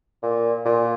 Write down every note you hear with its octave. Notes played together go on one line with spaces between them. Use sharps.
A#2
A#2